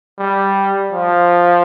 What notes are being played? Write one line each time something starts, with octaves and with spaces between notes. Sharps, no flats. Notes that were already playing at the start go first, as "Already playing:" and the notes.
G3
F3